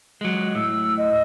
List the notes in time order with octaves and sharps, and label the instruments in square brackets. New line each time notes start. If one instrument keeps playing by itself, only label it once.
[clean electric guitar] F#3 G#3
[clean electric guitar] A2 [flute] E6
[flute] D#5